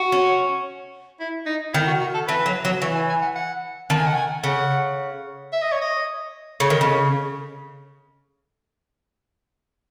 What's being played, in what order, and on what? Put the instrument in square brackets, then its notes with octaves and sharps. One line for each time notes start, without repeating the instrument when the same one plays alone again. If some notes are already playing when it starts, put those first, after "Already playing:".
Already playing: [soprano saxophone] F#4
[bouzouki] C#4
[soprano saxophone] E4
D#4
[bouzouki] D#3 [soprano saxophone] E4
[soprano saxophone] F#4
F#4
A4
[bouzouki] E3 [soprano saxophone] B4
[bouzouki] F#3
F#3
[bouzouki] E3 [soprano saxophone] C#5
[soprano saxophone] G#5
G#5
F#5
F#5
[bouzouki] D#3 [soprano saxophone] A5
[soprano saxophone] G#5
F#5
G#5
[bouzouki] C#3 [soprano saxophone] F#5
[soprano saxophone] E5
D#5
C#5
D#5
[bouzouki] C#3 [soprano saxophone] C#5
[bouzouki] D#3
C#3